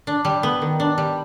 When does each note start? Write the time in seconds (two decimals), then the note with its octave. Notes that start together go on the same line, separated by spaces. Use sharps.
0.07 D4
0.25 G3
0.43 B3
0.62 D#3
0.80 D4
0.98 G3